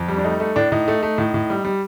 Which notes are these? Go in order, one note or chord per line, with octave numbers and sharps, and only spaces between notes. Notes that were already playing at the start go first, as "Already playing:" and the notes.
Already playing: F2
G3
D4
A3 D#4
A3 D#4
A2 D4
A2 D#4
A3
A3
A2
A2
G3
G3